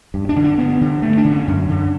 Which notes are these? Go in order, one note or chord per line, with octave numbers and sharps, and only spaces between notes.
G2
D4
D3
D4
G2 B3
D3
G2 A3
D4
D3
C#4
F#2
D3